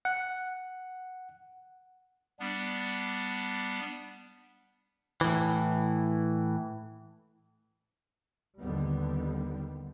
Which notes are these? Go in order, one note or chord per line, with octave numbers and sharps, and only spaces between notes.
F#5
G3 B3 D4
A2 E3
D#2 D3 D#3 G3 B3